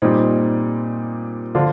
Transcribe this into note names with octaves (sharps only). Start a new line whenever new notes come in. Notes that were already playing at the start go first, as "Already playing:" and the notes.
A#2 G3 C4 D#4
D3 F3 D4 F4